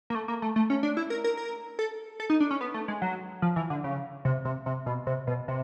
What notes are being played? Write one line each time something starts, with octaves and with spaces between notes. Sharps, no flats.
A#3
A3
A#3
A3
A3
C#4
D4
E4
A#4
A#4
A#4
A4
A4
D#4
D4
C#4
B3
A3
G#3
F#3
F3
E3
D3
C#3
C3
C3
C3
B2
C3
B2
C3